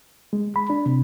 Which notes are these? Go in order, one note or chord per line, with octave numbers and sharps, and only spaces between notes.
G#3
B5
D4
C3